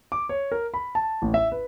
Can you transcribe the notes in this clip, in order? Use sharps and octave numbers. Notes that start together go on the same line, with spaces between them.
D6
C#5
A#4
B5
A5
A1
E5
B4